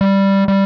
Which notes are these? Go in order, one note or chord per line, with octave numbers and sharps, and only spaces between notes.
G3
G3